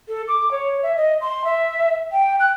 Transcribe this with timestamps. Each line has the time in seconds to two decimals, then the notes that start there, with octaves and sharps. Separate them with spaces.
0.08 A4
0.28 D6
0.51 C#5
0.83 E5
0.97 D#5
1.21 C6
1.45 E5
2.12 G5
2.40 F#6